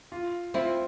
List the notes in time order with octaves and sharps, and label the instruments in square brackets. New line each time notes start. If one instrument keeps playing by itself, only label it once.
[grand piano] F4
[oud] C4 E4 [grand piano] F4